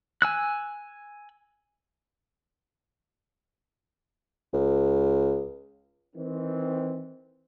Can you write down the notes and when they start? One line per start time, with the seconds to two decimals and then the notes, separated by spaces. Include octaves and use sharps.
0.22 G#5 E6 F#6
4.53 C#2
6.15 D#3 E3 C4